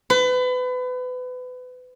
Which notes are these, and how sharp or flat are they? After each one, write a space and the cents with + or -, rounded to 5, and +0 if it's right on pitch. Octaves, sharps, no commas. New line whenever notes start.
B4 +30